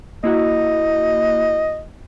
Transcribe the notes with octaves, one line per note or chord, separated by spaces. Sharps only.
A#3 E4 F#4 D#5